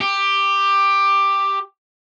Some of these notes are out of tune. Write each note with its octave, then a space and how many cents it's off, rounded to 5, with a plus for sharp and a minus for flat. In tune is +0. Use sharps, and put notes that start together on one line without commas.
G4 +10